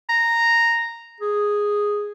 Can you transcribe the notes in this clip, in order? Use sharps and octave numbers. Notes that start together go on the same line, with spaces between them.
A#5
G#4